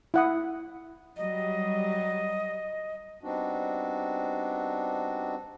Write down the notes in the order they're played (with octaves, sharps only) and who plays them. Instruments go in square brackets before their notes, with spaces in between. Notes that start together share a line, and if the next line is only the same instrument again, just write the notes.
[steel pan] E4 F#5 D#6
[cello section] F#3 G3 [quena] D#5
[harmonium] G3 B3 C4 D4 D#4 F#4